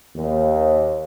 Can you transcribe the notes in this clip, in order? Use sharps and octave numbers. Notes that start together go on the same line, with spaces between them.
D#2